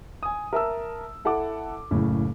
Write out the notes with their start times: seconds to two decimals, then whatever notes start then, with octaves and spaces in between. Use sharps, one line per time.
0.23 G#5 D#6
0.53 A#4 E5 A5 E6
1.25 E4 A4 F#5 A5 D6
1.91 F#1 A2 C#3